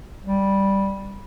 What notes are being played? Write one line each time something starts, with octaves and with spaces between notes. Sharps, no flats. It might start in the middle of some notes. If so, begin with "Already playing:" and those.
G3